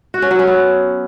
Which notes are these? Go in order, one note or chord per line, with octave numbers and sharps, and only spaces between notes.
F#4
C#4
F#3
C#4
B3